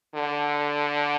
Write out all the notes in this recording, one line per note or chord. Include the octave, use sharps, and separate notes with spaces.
D3